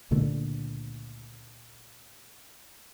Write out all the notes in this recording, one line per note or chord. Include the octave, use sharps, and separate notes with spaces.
C#2 A#2 D3 A3